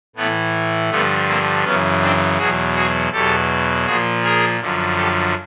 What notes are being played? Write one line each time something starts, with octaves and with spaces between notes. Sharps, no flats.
A2 E3 A3 B3
G2 D3 F3 A3 B3
A#3 C4
F#2 C#3 E3 B3 C#4
C4 D4
E2 B2 F#3 F#4 G#4
F#4 G#4
E2 B2 F#3 G4 A4
A#2 F3 F#4 G#4
G#4 A#4
F#2 D3 F3
G4 A4